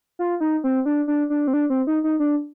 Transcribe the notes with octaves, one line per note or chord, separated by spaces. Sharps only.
F4
D#4
C4
D4
D4
D4
C4
D4
C4
D#4
D#4
D4